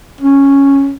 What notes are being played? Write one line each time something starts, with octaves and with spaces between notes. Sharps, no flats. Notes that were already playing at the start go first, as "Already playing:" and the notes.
C#4